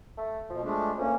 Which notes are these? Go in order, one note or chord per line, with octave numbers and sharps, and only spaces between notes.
A3
B2 F3
G#3 A3 D4
D2 A#3 C#4